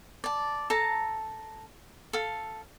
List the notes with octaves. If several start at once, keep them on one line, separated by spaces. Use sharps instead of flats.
D5 A5
A4 A5 A#5
A4 F5